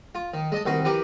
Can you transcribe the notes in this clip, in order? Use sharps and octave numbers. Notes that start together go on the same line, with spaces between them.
F4
D#3
G#3 D#5 A5
C2 D#3 F#4 B4 C6
E3 G4 A#4 B4